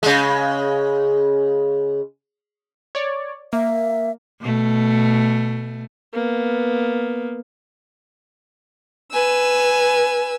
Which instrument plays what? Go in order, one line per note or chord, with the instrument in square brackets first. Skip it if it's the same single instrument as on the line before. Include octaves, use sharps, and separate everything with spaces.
[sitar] C#3 G#3
[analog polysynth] C#5 D5
[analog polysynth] A#3 [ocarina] E5
[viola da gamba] B2 A3
[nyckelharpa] A#3 B3
[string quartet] B4 G#5 E6